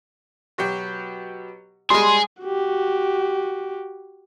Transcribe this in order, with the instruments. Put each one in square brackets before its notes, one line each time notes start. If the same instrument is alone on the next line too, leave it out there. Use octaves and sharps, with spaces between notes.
[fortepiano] B2 F#3 G4
[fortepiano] G3 G#3 [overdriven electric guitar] G#4 [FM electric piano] C6
[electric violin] F#4 G4